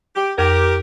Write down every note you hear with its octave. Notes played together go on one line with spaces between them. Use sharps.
G4
F2 G4 A#4